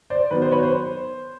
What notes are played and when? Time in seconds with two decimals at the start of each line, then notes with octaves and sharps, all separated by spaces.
0.10 C5 D5
0.31 D#3 F#3 B3 B4
0.42 C5
0.51 B4 C#5
0.63 C5